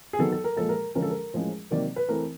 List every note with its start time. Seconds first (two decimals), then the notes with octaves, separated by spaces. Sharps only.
0.13 G#4
0.19 D#3 F#3 B3 A4
0.32 A4
0.44 A#4
0.56 A#2 F3 G#3 A4
0.69 A#4
0.95 D3 F3 G#3 C#4 A#4
1.02 A4
1.10 A#4
1.34 A2 F3 G#3 C#4
1.71 C3 D#3 F#3 A#3 D5
1.96 B4
2.09 E3 A3 C4 A#4